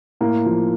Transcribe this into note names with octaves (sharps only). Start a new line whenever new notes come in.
A2 A#3
F3